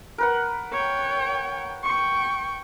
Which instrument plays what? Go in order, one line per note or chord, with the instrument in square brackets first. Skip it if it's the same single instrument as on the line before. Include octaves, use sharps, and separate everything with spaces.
[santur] A#4 B4 F#5
[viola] C#5 G5
G5 C#6